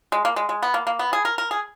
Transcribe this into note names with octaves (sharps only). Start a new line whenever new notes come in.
G#3
A#3
G#3
G#3
B3
A#3
A#3
B3
G#4
A#4
A#4
G#4